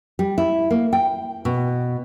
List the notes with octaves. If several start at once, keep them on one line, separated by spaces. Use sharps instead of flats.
G3
E4
A#3
G5
B2